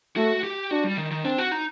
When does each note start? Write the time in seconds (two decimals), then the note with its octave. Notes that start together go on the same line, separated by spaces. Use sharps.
0.16 A3 F#4
0.43 G4
0.71 D4 F#4
0.84 G3
0.98 D#3
1.11 D#3
1.25 C4 D4
1.38 F#4
1.52 D#4